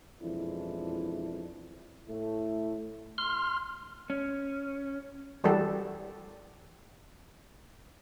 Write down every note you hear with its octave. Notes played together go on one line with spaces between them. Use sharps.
B1 F2 E3 G#3 D4 E4
A2 A3 E4
C6 F6
C#4
E3 G3 F#4 G4 A4